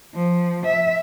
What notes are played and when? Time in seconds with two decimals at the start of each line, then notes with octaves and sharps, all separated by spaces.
0.15 F3
0.66 E5